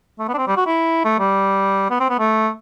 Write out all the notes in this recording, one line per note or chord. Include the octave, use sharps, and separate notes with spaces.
A3
B3
D4
C4
G3
F#4
E4
A3
G3
B3
C4
B3
A3